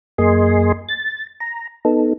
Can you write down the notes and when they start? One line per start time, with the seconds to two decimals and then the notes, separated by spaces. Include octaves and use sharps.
0.18 F#2 A#3 G#4 D#5 G#5 C6
0.89 A6
1.40 A#5
1.85 B3 D#4 A4